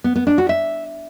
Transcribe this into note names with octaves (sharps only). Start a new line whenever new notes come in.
B3
B3
D4
F#4
E5